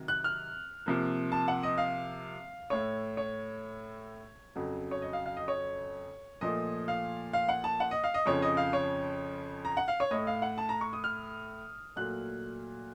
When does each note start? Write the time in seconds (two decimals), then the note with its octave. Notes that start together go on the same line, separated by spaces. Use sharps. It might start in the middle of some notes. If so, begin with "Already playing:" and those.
Already playing: C3 D#3 F#3
0.08 F#6
0.24 F6
0.86 C3 F3 A#3
1.32 A5
1.48 F#5
1.63 D#5
1.78 F5
2.70 A2 A3 C#5
3.17 C#5
4.55 F2 C#3 F#3
4.91 C#5
5.02 D#5
5.13 F5
5.26 F5
5.37 D#5
5.48 C#5
6.41 A#2 F3 A3 D#5
6.88 F5
7.33 F5
7.49 F#5
7.64 A5
7.80 F#5
7.91 D#5
8.04 F5
8.14 D#5
8.26 F2 C#3 F3 C#5
8.42 D#5
8.57 F5
8.73 C#5
9.65 A#5
9.77 F#5
9.88 F5
10.00 C#5
10.11 A2 A3 D#5
10.27 F5
10.42 F#5
10.58 A5
10.69 A#5
10.81 C#6
10.93 D#6
11.04 F6
11.96 A#2 F#3 A3 F#6